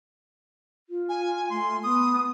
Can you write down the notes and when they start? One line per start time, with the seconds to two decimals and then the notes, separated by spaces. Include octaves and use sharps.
0.89 F4
1.09 G#5
1.50 A3 C6
1.83 B3 D#6